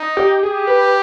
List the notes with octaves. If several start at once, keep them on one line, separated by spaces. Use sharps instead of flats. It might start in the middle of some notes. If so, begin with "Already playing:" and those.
Already playing: D#4
G4
G4 G#4
B4